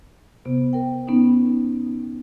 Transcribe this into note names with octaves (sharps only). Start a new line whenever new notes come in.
C3 B3
A#4 G5
B3 C#4 D#4